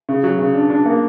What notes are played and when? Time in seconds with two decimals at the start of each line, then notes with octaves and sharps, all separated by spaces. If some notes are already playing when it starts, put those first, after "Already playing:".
0.09 C#3
0.23 F#3
0.39 C#3
0.54 D4
0.70 D4
0.86 A#3